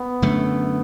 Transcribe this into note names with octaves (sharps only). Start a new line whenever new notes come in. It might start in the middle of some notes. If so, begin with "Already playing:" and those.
Already playing: B3
F#2 D3 A3